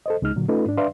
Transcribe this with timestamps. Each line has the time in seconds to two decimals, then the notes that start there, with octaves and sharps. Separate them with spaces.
0.06 A4 C5 D#5
0.22 C#2 G#3 D#4 F6
0.36 A#2 D3 F#3
0.48 A3 C#4 D#4 F4 A4 B4
0.66 G#2 D4
0.77 D4 B4 D5 E5 F5 C6